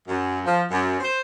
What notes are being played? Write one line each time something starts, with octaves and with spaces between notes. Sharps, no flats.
F#2
F3
F#2
C5